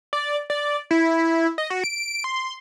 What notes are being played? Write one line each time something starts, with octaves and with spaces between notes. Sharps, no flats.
D5
D5
E4
D#5
F#4
D7
C6